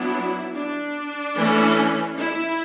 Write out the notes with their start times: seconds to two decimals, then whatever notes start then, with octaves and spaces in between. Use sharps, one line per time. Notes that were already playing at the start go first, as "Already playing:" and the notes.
Already playing: F#3 B3 D4 E4
0.54 D4
1.37 E3 A3 C#4
2.18 E4